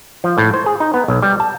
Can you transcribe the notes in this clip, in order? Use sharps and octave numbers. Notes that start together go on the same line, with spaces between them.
F3
A2
C5
G#4
D#4
B3
B1
G3
A5